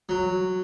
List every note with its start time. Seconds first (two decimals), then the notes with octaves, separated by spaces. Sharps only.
0.09 F#3